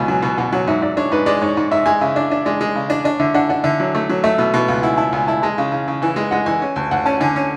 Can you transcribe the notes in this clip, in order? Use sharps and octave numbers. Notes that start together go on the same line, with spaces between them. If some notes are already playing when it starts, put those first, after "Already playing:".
Already playing: C#2 B2
F#3 G#5
B2
B2 F#5
F#3 F#5
G#2 E5
G#2 D5
D4 C#5
G#2 B4
G#3 D5
G#2 C#5
G#2
G#2 E5
G#3 G#5
C#3 E5
D4 D5
D4 E5
G#3 D5
G#3
C#3
D4
D4 C#5
D3 E5
D4 F#5
D4 F#5
D3 E5
F#3
A3
F#3
A3 E5
B2
B2
C#2
E4 F#5
E4 A5
C#2 G#5
E4 A5
G#3 A5
C#3
C#3
C#3
E3 G#5
G#3 G#5
G#3 F#5
E3 G#5
C#4
D2
D2 F#5
C#4 A5
D3 G#5
C#4